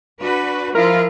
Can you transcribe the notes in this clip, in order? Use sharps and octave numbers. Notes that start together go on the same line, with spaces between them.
D4 F#4 B4
F3 E4 F4 A#4